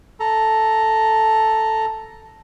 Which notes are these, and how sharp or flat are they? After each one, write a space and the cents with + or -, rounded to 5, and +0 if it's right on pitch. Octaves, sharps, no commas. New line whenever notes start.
A4 +0 A#5 +0